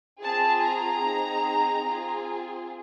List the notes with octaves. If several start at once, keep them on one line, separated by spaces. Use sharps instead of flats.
C4 F4 G#4 A5
A#5
C4 D#4 G#4
C4 F4 G#4